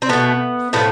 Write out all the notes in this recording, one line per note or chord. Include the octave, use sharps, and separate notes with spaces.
C4
B2 A3 B3
A2 F3 A3 B3